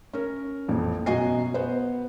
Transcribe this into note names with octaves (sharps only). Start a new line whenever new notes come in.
C#4 A#4
A1 F2 A#2
F#2 B2 F#4 D#5 G#5 C7
B3 C5